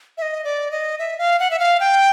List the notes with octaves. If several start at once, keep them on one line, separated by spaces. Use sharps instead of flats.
E5
D#5
D5
D#5
E5
F5
F#5
E5
F5
G5